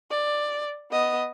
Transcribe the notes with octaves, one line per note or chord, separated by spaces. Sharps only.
D5
B3 D#5